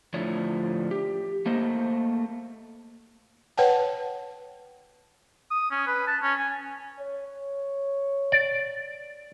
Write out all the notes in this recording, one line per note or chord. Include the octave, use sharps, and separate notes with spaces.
A2 D3 F3 A3 C#5 D5
G4
A3 A#3 C5 D#5
B4 C#5 F#5 G5 A5
D#6
C#4
B4
A5
C#4
G#5
C#5
D5